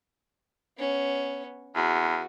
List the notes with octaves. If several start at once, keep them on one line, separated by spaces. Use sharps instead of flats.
B3 C#4
E2 F#4